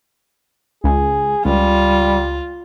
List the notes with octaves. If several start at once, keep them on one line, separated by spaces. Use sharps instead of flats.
C#2 G#4
C#2 G3 F4